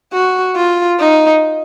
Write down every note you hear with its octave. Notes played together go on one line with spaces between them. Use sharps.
F#4
F4
D#4